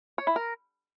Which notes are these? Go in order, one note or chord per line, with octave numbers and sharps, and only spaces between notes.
C#5
E4
A#4